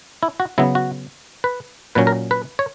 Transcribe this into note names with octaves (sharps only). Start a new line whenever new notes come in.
E4
F#4
C#3 F#3 B3 E4
F#4
B4
A#2 F#3 C#4 B4
A#4
B4
C#5